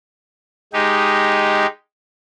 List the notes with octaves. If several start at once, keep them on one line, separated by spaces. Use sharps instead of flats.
G#3 D#4 G4